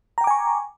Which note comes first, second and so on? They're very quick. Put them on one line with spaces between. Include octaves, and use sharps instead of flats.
A#5 G5 D6 G#5 C#6